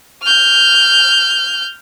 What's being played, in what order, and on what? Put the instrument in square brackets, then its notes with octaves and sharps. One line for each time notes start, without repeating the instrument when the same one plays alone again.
[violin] F6 G6